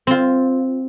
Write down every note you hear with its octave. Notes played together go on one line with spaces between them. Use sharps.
C4 F4